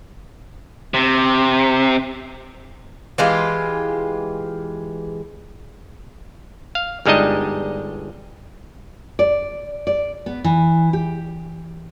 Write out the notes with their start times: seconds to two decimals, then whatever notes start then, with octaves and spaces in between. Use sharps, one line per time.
0.94 C3
3.18 E3 G#3 F4 G4
6.75 F5
7.06 G1 G3 G#3 D4 D#4 D#5
9.19 D5
9.87 D5
10.26 B3
10.44 E3
10.93 G4